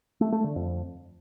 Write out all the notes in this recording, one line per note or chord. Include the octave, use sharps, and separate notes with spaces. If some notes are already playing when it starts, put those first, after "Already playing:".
A3
A3
D3
F2